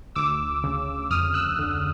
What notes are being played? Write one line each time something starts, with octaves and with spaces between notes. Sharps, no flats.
D2 D6 E6
C#3
F2 D#6 F6
E6 F#6
D3